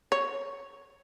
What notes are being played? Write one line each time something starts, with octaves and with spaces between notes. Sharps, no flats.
C#5